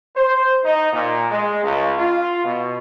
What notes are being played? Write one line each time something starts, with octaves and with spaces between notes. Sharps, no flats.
C5
D#4
A#2
G#3
C#2
F4
B2